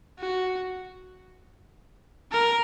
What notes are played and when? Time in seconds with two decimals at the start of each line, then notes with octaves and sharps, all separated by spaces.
0.19 F#4
2.31 A#4